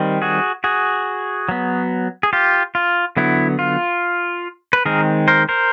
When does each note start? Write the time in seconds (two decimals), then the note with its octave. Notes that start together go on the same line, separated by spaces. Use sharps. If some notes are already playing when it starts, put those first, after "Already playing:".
Already playing: D#3 G3 C4
0.22 F#4 G#4
0.64 F#4 G#4
1.49 F#3 B3
2.23 G#4
2.33 F4 G4
2.75 F4
3.17 D3 F#3 B3 E4
3.59 F4
4.73 B4
4.85 D#3 G#3 C4 G#4 A#4
5.28 A#4 C5
5.49 A#4 C5